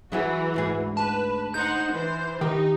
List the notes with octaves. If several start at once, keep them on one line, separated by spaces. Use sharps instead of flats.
E3 F#3 E4 F#4 G#4
D2 G#2 G#4
B4 A5
D#4 C5 F#5 G6
E3 C5
D#3 D#4 G4